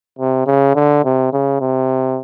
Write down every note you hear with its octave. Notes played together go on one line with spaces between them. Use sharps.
C3
C#3
D3
C3
C#3
C3